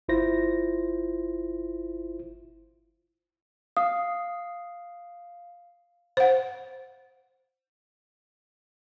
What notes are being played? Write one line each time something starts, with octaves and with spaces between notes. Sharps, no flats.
G1 E4 F4 C5 A#6
F5 D#6
C5 F#5